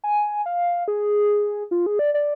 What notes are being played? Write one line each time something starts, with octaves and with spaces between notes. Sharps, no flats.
G#5
F5
G#4
F4
G#4
D5
D5